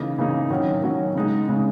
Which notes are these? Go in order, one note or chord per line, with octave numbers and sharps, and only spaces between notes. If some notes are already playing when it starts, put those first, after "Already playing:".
Already playing: C#3 E3 A#3 D#4
C#3 E3 A#3 D#4
D#3 F#3 C#4 F#4
D#3 F#3 C#4 F#4
C#3 G#3 D#4
C#3 G#3 D#4